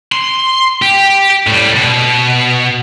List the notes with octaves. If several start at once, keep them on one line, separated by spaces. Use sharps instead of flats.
C6
G4
A2 G3
B2